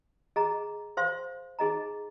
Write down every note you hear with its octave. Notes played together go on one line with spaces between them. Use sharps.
G#4 D#5 A#5
C5 F5 C6
D#4 G#4 D#5 A#5